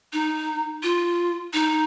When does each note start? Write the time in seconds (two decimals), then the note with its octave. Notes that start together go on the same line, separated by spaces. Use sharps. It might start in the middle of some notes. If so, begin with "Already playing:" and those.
0.13 D#4
0.83 F4
1.53 D#4